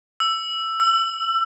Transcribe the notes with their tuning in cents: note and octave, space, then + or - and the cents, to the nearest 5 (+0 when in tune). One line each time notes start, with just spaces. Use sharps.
E6 +10
E6 +30